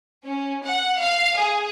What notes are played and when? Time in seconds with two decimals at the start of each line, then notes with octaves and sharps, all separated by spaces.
0.25 C#4
0.64 F#5
0.99 F5
1.37 G#4